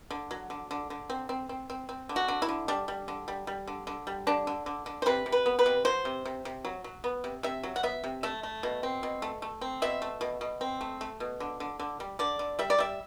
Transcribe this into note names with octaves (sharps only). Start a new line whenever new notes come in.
D3
F#3
D3
D3
D3
C4
C4
C4
C4
C4
D3
F#4
D3
E4
D3
G3 D4
G3
D3
G3
G3
D3
D3
G3
D3 D4
D3
D3
D3
C5
C3 B4
C3
B4
B3
B4
C3
F#3 C5
C3
C3
C3
F#3
F#3
B3
C3
C3 E5
F#3
F#5
B3 E5
C3
A3 E5
A3
B2
C4
B2
A3
A3
C4
B2 E5
A3
B2
B2
C4
A3
A3
B2
D3
D3
D3
G3
D3 D5
D3
G3 E5
D5
G3 E5